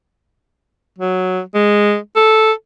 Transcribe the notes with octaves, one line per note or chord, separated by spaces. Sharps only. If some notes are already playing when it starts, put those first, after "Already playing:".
F#3
G#3
A4